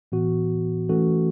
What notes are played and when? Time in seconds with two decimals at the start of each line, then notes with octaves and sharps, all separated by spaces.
0.12 A2 E3 B3 F#4
0.89 E3 A3 C#4 F#4 A4